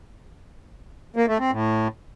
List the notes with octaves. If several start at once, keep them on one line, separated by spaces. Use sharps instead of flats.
A#3
A3
C4
A2